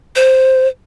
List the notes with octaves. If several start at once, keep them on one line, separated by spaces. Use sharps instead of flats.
C5